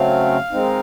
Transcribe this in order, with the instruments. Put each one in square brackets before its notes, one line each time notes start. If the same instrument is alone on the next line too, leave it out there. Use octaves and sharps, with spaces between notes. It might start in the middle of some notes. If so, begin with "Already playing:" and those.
Already playing: [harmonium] C#3 F#3 A3 C4 F5
D#3 G#3 C4 D#4